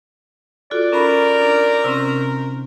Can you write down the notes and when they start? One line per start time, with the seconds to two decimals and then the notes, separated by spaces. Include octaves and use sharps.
0.71 F4 F#4 A4 D5
0.92 D#3 C#4 A#4 B5
1.41 D4
1.84 C3 C4 C#4